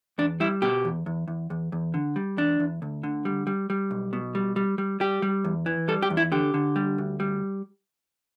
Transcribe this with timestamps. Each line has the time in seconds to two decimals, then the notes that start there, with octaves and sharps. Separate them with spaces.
0.18 E2 D4
0.40 G3 E4
0.62 B2 G4
0.85 E2
1.06 E2
1.28 E2
1.50 E2
1.72 E2
1.94 D3
2.16 G3
2.37 E2 D4
2.60 E2
2.82 D2
3.03 D3
3.25 G3
3.47 G3
3.70 G3
3.91 B1
4.13 B2
4.35 G3
4.56 G3
4.78 G3
5.00 G3 G4
5.22 G3
5.44 E2
5.66 E3
5.88 G3 A4
6.02 G4
6.10 E2
6.17 E4
6.32 D3 G4
6.54 D3
6.76 G3
6.98 D2
7.20 G3